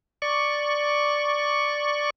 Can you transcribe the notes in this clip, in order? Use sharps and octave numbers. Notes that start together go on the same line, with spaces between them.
D5 C#6